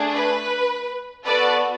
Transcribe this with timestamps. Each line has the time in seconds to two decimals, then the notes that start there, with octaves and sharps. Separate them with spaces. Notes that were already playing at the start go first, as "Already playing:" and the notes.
Already playing: A3 D4 G#4
0.14 B4
1.26 B3 F#4 A4 B4 D5